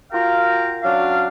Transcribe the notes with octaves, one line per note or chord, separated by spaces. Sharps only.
F4 F#4 A#4 F5 G5 A#5
F#3 C#4 D4 F5